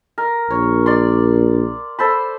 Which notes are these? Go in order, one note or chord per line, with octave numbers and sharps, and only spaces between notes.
A#4
A#1 C#5
D5 C6
A4 C5 B5